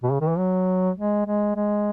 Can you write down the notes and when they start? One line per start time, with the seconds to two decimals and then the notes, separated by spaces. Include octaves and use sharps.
0.03 B2
0.12 C#3
0.21 D#3
0.29 E3
0.38 F#3
0.96 G#3
1.26 G#3
1.55 G#3